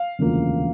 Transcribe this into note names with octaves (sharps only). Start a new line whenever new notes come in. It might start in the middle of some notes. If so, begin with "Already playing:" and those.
Already playing: F5
E1 D2 C#3 F3 A#3